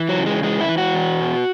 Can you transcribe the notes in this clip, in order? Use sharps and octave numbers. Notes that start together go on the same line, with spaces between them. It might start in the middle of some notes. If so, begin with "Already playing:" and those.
Already playing: E3
F#3
C#3
G#3
E3 G#3
E4
E3
F#4
E2
B2